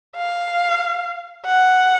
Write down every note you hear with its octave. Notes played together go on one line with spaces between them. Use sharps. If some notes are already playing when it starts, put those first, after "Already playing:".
F5
F#5